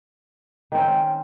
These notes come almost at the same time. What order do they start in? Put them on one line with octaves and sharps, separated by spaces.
D#3 C4 C#4